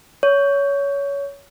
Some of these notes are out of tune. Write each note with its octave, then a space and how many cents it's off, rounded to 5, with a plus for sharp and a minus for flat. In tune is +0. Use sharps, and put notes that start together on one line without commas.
C#5 +20